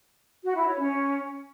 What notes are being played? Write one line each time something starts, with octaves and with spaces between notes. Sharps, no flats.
F#4
E4
C#5
C#4